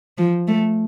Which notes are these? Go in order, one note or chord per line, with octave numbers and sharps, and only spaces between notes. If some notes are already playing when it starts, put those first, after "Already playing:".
F3
A3